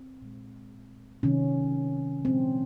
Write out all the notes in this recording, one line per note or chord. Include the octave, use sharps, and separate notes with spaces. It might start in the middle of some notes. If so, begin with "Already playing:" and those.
Already playing: C4
A#2 G#3
C3 D#3 F#3 C#4
A#2 F3 G#3 C4